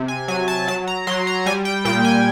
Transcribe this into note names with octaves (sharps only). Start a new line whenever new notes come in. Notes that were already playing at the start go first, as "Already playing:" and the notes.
Already playing: C3
G#5
F#3 G#5
A5
F#3 A5
A#5
F#3 C6
A#5
G3 G#5
G5
A#2 G5
G#5